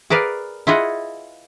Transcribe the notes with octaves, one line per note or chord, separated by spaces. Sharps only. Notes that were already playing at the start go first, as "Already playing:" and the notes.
G#4 A#4 B4 D5 F5
E4 F4 G#4 D#5 F#5